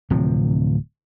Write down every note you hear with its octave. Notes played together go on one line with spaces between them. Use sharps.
D1 C3 F3